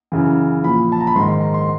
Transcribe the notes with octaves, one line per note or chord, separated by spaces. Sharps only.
F#2 C#3 E3
A#2 F3 B5
A5
A#5
B5
G#2 D#3 C6
C6
A#5
C6